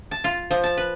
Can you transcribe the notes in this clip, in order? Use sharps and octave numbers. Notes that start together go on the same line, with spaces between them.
A5
F4
F3
A5
B4